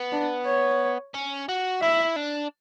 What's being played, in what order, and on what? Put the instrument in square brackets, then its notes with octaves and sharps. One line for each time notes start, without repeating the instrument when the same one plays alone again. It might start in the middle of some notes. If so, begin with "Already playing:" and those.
Already playing: [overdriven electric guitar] B3
[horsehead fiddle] D4
C#5
[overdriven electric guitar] C#4
F#4
[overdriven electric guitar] E4 [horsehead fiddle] E5
[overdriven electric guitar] D4